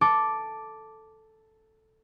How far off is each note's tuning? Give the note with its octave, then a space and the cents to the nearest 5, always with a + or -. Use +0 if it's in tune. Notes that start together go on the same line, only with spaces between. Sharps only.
A4 +0 D6 +0